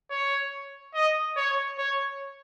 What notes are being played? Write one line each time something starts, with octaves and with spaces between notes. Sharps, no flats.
C#5
D#5
C#5
C#5